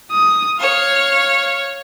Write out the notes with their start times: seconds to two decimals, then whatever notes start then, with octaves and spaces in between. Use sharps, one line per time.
0.12 D#6
0.60 C#5 F5